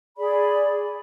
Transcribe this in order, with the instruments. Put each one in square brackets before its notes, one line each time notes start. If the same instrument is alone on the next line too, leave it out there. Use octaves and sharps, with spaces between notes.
[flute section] G#4 D5 B5